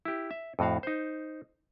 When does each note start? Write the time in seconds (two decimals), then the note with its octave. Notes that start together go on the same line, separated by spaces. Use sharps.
0.05 E4 G4
0.31 E5
0.59 F2 A2 F#4 F5
0.83 D#4 C5